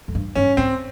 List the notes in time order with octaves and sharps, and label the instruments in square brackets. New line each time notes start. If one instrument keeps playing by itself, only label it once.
[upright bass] F2
G2
[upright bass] G2 [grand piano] C#4
[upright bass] G#2 [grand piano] C4